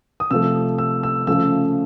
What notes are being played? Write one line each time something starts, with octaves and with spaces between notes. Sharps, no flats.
D#6
C3 F3 A3 E6
E6
E6
C#3 F3 A3 E6